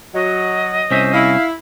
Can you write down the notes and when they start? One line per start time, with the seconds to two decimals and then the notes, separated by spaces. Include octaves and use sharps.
0.14 F#3 D#5
0.91 C2 C#4 C5 E5
1.13 E4 F5